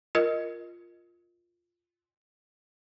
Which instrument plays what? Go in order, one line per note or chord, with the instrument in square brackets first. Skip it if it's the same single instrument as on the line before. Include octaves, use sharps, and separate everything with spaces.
[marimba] F4 A#4 D#5